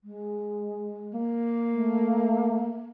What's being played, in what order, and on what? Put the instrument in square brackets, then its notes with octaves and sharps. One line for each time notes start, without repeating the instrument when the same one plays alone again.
[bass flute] G#3
[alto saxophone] A#3
[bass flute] A3